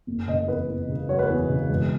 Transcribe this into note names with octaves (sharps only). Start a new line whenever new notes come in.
F#1
C#3 D#5
E2 B4
E2
C#3
F#3 C#5
B4
E2
C#3
E1